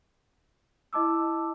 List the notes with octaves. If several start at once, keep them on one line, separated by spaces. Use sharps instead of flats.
E4 D#5 A5 D6 E6